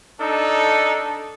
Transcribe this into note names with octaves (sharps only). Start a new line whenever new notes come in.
D4 D#4 A4